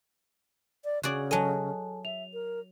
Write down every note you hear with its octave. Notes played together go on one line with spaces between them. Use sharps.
D5
C#3 F#4 G#4 D5
F#3 A4 D#5 G#5 A5
E5 F7
A#4